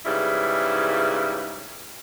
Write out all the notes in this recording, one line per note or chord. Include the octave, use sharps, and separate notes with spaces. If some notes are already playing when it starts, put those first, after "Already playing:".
G#2 C#3 G3 E4 B4